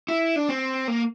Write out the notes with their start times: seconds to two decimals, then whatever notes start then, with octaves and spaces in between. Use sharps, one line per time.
0.08 E4
0.36 D4
0.49 C4
0.88 A#3